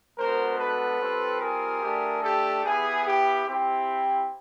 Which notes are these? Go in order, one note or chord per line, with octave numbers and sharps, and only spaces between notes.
G#3 B3 D4 F#4 A#4 C5
A4 B4
G3 C4 F4
G#4 A#4
A3 D4 G4
G4 A4
B3 E4 G4 G#4
G4
C4 E4 G4